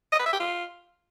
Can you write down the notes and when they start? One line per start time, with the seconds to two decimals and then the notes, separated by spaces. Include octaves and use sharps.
0.13 D#5
0.19 B4
0.26 E5
0.33 G4
0.40 F4